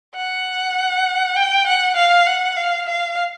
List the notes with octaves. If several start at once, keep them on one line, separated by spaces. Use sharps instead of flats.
F#5
G5
F#5
F5
F#5
F5
F5